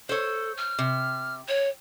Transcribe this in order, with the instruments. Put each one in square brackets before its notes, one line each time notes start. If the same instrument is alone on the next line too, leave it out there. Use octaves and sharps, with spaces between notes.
[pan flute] A4 [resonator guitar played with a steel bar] C5 C#5
[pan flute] F6
[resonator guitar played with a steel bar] C3
[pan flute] C#5